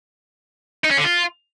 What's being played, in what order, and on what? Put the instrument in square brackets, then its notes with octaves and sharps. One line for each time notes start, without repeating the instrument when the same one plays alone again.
[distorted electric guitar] D#4
C#4
D3
F4